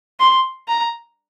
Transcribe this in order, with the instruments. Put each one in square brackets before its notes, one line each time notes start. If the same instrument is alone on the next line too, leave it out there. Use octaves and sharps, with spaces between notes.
[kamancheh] C6
A#5